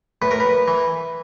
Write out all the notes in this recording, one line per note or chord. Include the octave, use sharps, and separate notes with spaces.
A2 B4
A#4
B4
E3